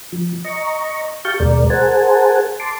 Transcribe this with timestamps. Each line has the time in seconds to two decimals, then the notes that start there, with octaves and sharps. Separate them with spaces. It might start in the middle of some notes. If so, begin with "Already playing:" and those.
0.12 F3
0.44 D#5 A#5 C#6
1.25 G4 F5 A5 C#6 G6
1.40 D#2 B2 G#3 A#4 D5
1.70 G#4 A#4 C5 F#5 G#5 A5
2.60 A5 C6 D6